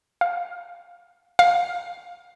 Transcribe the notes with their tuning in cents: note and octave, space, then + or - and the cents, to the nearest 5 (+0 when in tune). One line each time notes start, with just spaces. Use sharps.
F5 +10
F5 +10